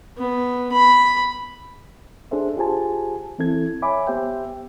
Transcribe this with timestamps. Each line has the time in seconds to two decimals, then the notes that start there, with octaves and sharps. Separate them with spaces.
0.18 B3
0.72 B5
2.31 D4 G#4 A4 C5 E5
2.57 F4 G4 G#4 C5 G#5 A5
3.38 E3 C4 E4 A4 G#6
3.82 C#5 E5 G#5 B5 D6
4.07 B3 G4 C5 E5 G5